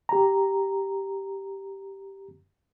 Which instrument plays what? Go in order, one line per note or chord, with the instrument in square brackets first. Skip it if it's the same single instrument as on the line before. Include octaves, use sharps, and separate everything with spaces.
[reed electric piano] G4 A#5